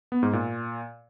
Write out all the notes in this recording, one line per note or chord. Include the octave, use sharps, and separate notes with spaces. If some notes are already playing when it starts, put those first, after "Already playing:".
B3
G#2
A#2